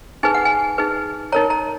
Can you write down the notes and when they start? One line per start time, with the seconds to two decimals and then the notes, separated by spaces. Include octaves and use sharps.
0.23 D#4 G#4 B4 G#5
0.34 F#5
0.45 G#5
0.78 D#4 G#4 B4
1.32 D#4 A#4 C#5 A#5
1.50 A#5